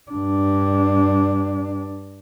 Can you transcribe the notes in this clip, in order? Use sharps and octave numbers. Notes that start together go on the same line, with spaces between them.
G2 D4